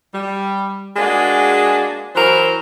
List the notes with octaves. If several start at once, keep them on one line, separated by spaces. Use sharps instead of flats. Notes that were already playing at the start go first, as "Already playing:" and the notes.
G3
G#3 A#3 D4 F#4 G#4
E3 F#3 A#4 C5